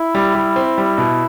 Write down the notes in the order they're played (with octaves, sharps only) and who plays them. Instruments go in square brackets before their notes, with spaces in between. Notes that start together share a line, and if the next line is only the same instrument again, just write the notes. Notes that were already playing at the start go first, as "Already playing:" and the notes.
Already playing: [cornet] E4
[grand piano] G3
G3
C4
G3
B2